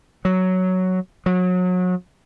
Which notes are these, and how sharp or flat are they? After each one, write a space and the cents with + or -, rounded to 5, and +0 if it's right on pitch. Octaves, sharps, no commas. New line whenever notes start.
F#3 +5
F#3 -30